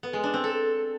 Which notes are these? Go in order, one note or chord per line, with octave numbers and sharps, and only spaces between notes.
B3
G#3
D4
C4
A4